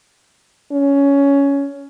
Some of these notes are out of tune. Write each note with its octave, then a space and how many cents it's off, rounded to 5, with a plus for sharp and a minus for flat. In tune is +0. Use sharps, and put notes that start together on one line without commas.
C#4 +15